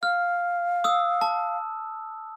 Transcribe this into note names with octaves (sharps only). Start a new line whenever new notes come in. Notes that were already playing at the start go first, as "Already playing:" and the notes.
F5 F6
D#6 E6
A5